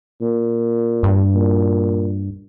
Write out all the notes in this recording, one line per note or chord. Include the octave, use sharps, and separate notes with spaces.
A#2
G2
A#2